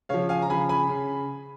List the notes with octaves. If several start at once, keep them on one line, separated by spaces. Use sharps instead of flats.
C#3 F3 C#5 F5
F5 G#5
A#5
C#3 F3 G#5 B5
G#5 B5
C#3